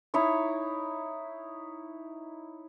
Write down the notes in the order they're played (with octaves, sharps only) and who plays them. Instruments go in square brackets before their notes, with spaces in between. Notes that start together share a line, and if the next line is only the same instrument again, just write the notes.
[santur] D#4 E4 C#5